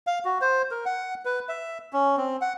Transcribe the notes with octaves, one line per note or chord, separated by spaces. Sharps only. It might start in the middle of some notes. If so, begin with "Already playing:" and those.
F5
F#4
C5
A#4
F#5
B4
E5
C#4
C4
F#5